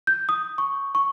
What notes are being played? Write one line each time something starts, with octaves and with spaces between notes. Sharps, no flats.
G6
D#6
C#6
C#6